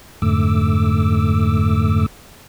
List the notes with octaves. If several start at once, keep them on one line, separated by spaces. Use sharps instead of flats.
F2 G#2 D3 A3 D6 E6